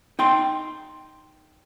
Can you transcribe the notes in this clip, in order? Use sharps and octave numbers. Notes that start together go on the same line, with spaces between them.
D#4 G5 C6